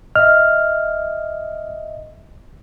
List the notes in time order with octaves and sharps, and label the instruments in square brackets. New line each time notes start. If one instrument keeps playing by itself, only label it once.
[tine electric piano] D#5 E5 [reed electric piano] F6